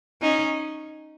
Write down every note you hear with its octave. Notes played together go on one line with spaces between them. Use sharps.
C#4 D#4